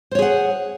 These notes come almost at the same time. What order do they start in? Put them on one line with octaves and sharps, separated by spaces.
C5 C#5 G#4 F#5